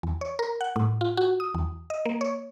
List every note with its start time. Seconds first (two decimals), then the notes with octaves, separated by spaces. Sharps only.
0.03 E2
0.21 C#5
0.39 A#4
0.61 F#5
0.76 A2
1.01 F4
1.17 F#4
1.40 D#6
1.54 E2
1.90 D#5
2.05 A#3
2.21 C#5